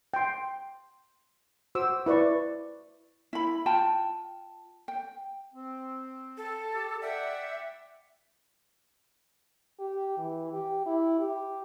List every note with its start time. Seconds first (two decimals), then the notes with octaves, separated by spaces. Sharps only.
0.14 G5 C6
1.75 F#4 C5 D6 E6
2.06 E4 B4 D5 C#6
3.33 E4 B5
3.66 F4 G5 A5
4.88 G5
5.54 C4
6.37 A4
6.73 G4
7.02 D5 E5 F#5 G5
9.79 G4
10.18 E3
10.53 G4
10.86 E4
11.20 G4